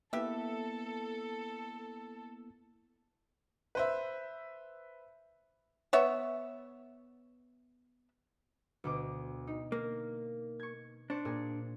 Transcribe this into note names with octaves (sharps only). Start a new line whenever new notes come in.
A#3 B3 E4 G4 A4 B4 E5
B4 C5 E5
B3 C#5 E5
D2 B2 D6
D#4
A#3
C#6 G#6
D4 C5 C#6
A#2 G#4